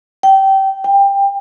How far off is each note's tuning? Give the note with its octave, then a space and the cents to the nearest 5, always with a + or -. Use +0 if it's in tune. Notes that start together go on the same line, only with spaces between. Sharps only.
G5 -20
G5 +20